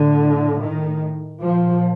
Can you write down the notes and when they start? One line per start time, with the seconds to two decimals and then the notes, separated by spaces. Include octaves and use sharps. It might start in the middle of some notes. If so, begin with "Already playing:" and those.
Already playing: A2 D3
0.63 D#3
1.40 A#2 F3